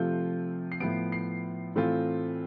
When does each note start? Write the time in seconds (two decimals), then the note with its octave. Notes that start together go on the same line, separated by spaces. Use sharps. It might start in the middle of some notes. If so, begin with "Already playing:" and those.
Already playing: C3 F3 A3 C4 F4 G6
0.72 C7
0.80 A2 F3 B3 D7
1.12 C7
1.75 A2 E3 A3 C4 F4